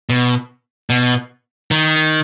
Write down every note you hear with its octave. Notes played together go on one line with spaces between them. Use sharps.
B2
B2
D#3